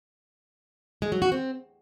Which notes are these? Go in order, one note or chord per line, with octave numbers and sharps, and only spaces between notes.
G#3
F#3
F#4
C4